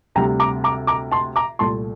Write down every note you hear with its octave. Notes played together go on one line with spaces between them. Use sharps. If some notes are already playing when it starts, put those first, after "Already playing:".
D2 C3 G3 G5 A#5
A#5 D6
A#5 D6
A#5 D6
A5 C6
A#5 D6
C2 A#2 A3 A5 C6